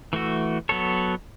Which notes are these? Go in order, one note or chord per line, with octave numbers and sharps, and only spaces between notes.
E3 A3 F#4
F#3 B3 A4 C#5